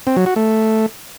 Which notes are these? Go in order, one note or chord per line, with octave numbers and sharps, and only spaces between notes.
C4
F#3
F#4
A3